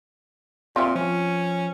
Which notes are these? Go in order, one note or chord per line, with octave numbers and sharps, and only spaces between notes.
A#2 C4 F4 E5
F3 C#4